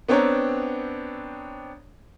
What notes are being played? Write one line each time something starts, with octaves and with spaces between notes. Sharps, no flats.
B3 C4 D4 C#5 G5 A#5